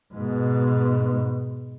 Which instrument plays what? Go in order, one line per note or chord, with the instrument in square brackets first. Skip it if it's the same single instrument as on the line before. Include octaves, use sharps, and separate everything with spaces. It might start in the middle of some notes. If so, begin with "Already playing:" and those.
[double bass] G#2 B2